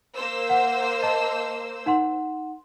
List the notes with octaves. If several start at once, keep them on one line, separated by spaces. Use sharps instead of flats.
A#3 C5 E6
F#5
D#5 A5
D#4 F#5 C6